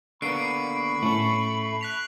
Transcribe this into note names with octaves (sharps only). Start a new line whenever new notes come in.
D3 A#3 B3 B5 C#6 C7 D7
A2 A3 C#4 F#7
F#6 B6 F7